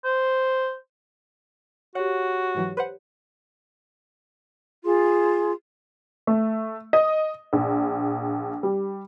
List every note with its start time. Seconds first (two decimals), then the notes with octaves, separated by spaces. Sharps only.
0.05 C5
1.95 F#4 G4 C#5 F#5
2.55 G#2 E3 F#3
2.77 B4 C5 F#5
4.85 F4 G#4 C6
6.27 A3
6.93 D#5
7.53 A#1
8.63 G3